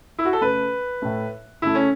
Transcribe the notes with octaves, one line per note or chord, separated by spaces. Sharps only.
E4
F#4
A4
C#3 A3 B4
A2 A3
C#3 A3 E4
C#4